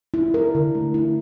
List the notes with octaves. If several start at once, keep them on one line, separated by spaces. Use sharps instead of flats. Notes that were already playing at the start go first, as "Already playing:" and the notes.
E4
A#4
D3
A3
E4